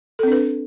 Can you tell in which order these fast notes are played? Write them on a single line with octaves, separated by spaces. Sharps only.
A4 C4 D4 B4